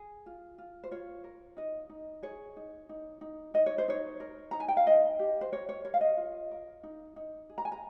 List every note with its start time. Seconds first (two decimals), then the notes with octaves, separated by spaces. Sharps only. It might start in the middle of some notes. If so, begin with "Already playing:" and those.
Already playing: G#4
0.26 F4
0.58 F4
0.84 C5
0.91 F4 C#5
1.24 A#4
1.57 D#4 D#5
1.90 D#4
2.23 G#4 C#5
2.57 D#4
2.89 D#4
3.21 D#4
3.54 D#4 D#5
3.66 C#5
3.78 C5
3.88 D#4 C#5
4.20 A#4
4.51 D#4 A#5
4.60 G#5
4.68 G5
4.77 F5
4.87 D#4 D#5
5.19 G4
5.41 C5
5.52 A#4 C#5
5.69 C#5
5.85 A#4 C#5
5.94 F5
6.01 D#5
6.17 F4
6.51 A#4
6.83 D#4
7.16 D#4
7.50 G#4
7.58 A#5
7.65 G#5
7.72 A#5